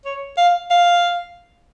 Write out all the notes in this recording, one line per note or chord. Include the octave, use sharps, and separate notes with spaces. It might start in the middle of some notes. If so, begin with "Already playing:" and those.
C#5
F5
F5